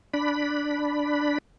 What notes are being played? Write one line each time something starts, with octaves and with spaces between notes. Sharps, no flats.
D4 B5